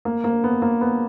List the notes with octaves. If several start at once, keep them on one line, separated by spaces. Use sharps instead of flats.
A#3
A#3
B3
A#3
B3